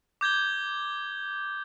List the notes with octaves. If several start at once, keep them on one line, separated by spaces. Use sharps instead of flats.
D6 G6 G#6 G7